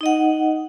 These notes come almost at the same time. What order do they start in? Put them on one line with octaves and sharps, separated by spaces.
D#4 D#5 F#5